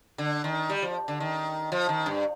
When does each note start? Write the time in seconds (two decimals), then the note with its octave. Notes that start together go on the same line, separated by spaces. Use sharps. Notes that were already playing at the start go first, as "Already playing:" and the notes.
0.18 D3
0.44 D#3
0.69 G3
0.82 F3
1.08 D3
1.20 D#3
1.72 F3
1.89 D#3
2.06 G2